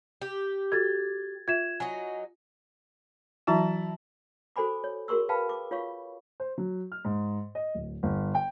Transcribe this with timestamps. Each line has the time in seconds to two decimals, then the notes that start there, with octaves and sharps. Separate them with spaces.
0.21 G4
0.72 F#4 A4 G#6 A6
1.48 F4 E5 G#6 E7
1.80 F#3 D#4 G#5
3.47 E3 F#3 E4 F#4 A5 A#5
4.56 F#4 A4 C5 G#5 B5 D6
4.84 C#5
5.08 F#4 G#4 A#4 C6 C#6 E6
5.29 B4 F5 G5 A5 B5
5.49 D6
5.71 F4 C#5 F5 C#6
6.40 C5
6.58 F#3
6.92 F6
7.05 G#2
7.55 D#5
7.75 D1
8.03 G1
8.35 G5